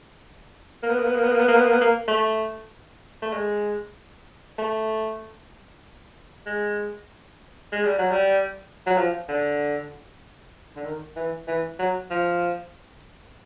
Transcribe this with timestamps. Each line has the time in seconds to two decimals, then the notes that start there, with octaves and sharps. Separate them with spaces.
0.83 A#3
0.90 B3
0.99 A#3
1.07 B3
1.15 A#3
1.24 B3
1.32 A#3
1.40 B3
1.48 A#3
1.56 B3
1.65 A#3
1.73 B3
1.81 A#3
2.08 A3
3.22 A3
3.33 G#3
4.58 A3
6.46 G#3
7.72 G#3
7.85 G3
7.99 F#3
8.12 G3
8.86 F#3
8.97 F3
9.29 D3
10.76 D3
10.85 D#3
11.16 E3
11.47 E3
11.79 F#3
12.10 F3